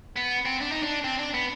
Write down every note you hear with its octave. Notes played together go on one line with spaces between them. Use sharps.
B3
C4
D4
D#4
D4
C4
D4
B3